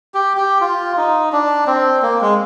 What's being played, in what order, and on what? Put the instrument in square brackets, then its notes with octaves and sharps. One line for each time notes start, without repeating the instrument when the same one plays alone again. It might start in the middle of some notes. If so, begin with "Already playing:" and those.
[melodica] G4
G4
F4
D#4
D4
C4
A#3
G#3